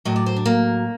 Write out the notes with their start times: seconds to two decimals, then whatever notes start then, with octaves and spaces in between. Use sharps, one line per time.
0.05 A2 F#3 D#5
0.16 D5
0.26 C5
0.36 D4
0.46 A#3